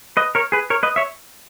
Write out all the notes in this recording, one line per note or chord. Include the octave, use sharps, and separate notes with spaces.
B4 D#5
A#4 C#5
G#4 B4
A#4 C#5
B4 D#5
C#5 E5